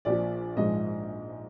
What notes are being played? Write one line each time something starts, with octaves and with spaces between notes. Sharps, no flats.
A#1 A#2 F3 D5
A#1 G#2 F3 G#3 D#5